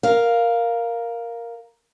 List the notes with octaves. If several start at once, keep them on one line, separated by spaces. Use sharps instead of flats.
A#4 F5